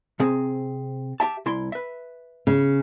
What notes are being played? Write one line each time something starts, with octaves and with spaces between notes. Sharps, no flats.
C3 C4 G#4
G4 E5 A5
C2 E4 C6
B4 E5
C#3